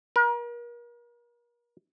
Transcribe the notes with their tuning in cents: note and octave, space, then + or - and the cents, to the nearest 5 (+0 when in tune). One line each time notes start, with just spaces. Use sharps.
A#4 +40